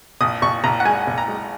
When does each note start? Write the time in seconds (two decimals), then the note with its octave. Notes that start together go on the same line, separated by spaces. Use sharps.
0.21 A#1 D#6
0.42 A#1 C#6
0.64 A#1 A#5
0.80 F#5
0.85 G#3 G#5
1.07 A#1
1.18 A#5
1.28 G#3